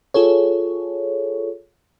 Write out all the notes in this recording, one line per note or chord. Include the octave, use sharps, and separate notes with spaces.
F4 G#4 A4 C#5